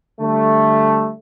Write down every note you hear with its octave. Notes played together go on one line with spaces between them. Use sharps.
D3 G3 A3